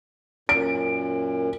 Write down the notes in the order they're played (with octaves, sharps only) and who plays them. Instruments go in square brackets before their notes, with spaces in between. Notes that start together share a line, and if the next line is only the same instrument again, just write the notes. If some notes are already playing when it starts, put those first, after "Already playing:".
[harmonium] F#2 A#2 [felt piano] D7